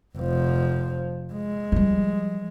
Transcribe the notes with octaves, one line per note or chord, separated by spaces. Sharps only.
F1 F3
G#3
F3 G3